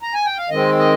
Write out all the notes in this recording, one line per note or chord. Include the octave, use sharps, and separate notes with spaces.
A#5
G#5
G5
F5
D#3 G#3 C4 D#5
D#5